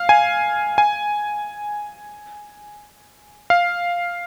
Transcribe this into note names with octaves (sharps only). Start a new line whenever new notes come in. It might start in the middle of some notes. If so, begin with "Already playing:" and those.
Already playing: F5
G#5
G#5
F5